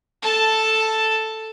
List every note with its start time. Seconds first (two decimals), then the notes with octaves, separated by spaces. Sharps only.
0.22 A4 A5